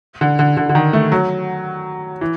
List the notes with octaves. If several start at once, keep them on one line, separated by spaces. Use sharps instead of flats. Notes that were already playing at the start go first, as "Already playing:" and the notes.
D3
D3
D3
D3
D#3
A3
F#3
E3